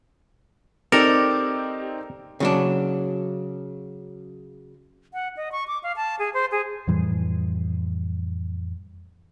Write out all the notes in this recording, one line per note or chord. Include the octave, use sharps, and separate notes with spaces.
C4 D#4 G4 A4 A#4 D5
C#3 F#3 D4
F#5
D#5
C#6
D6
F5
A5
G#4
C5
G#4
F2 A2 E3 G3